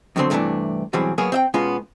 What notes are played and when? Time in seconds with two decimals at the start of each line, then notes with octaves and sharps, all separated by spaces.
0.16 F2 B2 D3 F#3 C4 C6
0.30 G2 C3 E3 G#3 A3 D4
0.93 B2 E3 F#3 G3 C4 G#4
1.18 F#3 A#3 B3 G#4 C#5
1.32 C4 E5 G5
1.54 B2 G#3 B3 C#4 F4